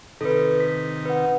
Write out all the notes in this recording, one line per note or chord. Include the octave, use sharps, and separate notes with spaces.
C3 D#3 D#4 A4 B4
B6
B4 F#5